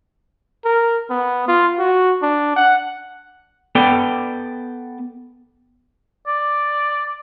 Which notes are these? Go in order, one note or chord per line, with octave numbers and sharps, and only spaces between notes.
A#4
B3
F4
F#4
D4
F#5
B3 A4 D5 G5
D5